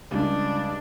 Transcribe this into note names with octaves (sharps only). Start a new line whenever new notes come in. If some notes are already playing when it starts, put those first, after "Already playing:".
C#2 G3 D4